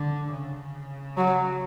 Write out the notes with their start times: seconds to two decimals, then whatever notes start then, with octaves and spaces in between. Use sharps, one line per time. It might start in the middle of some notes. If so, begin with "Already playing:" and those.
Already playing: D3
0.32 C#3
1.17 F#3